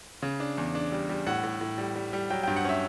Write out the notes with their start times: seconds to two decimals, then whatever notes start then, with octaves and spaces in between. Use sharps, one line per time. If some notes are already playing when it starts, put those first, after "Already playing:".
0.22 C#3
0.40 D4
0.58 E2
0.75 D4
0.92 G3
1.09 G3
1.27 A2 F#5
1.44 A2
1.61 A2
1.78 G3
1.96 G3
2.13 G3
2.30 F#3 G5
2.43 G5
2.47 G2
2.56 F#5
2.65 C#4 E5